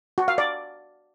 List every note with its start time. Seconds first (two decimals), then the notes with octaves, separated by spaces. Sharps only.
0.18 F#4
0.28 F5
0.38 D5